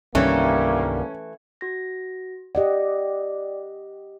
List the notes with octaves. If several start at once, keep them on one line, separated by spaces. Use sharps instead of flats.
C2 G2 D#3 E3 G3 A3 A#3 C#4
F#4 A#6
G4 D5 D#5 F#5